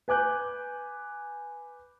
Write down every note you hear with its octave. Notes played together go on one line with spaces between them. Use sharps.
B4 G#5 D6 F#6 G6